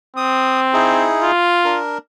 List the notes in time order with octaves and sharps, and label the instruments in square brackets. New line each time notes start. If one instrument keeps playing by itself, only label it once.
[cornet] C4 [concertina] D#6
[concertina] D#4 E4 G#4
[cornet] F4
[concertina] D4 A#4